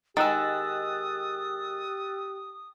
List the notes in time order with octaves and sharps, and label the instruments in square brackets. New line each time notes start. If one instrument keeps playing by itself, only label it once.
[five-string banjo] D#3 G#3 [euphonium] G4 [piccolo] D#6 [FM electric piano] E6 F#6 A6